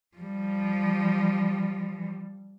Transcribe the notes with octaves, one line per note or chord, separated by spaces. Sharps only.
F3 G3